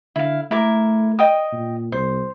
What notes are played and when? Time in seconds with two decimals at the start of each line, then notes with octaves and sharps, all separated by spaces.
0.16 D3 E4 F5
0.51 A3 E4 A#4 D6
1.19 D#5 G5 D#6
1.52 A#2
1.92 C2 C5